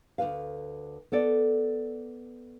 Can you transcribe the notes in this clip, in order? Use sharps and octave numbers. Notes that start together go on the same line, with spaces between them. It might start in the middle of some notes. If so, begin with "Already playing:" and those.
D2 C3 B4 F5
B3 A4 D5